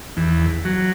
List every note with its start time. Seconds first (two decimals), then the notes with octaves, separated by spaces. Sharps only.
0.17 E2
0.65 F#3